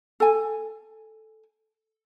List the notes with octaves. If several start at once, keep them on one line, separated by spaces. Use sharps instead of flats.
A4 G#5